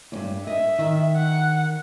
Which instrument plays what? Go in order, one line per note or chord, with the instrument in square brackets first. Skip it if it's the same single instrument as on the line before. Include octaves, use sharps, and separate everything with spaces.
[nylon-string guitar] E2 G2
[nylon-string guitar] D#5 [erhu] E5
[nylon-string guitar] D#3
[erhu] F#5